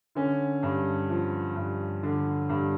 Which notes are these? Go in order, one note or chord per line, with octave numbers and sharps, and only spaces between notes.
D3 C#4
G2
F3
G2
D3
G2